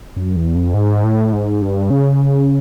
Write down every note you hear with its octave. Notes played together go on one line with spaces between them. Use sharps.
F#2
E2
F2
G#2
A2
G#2
G2
C#3